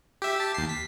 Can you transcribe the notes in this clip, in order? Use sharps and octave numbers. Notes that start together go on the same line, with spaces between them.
G4 E5
G4 A5
D#2 C7
B6